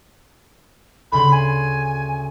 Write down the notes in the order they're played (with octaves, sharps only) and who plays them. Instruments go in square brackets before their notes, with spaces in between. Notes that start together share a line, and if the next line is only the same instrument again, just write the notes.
[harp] D2 C#3 C6 [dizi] B5
[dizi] G#5